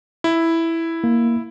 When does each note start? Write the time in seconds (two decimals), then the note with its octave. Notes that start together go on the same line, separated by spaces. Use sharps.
0.24 E4
1.04 A#3